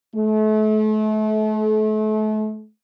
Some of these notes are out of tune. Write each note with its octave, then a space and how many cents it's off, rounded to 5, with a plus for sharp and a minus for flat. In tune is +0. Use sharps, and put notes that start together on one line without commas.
A3 -35